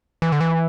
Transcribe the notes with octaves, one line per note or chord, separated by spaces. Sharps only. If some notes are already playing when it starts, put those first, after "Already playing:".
E3
D3
E3